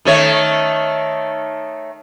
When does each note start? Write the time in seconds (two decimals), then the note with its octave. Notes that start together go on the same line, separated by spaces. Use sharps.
0.05 D#3 A3 C#5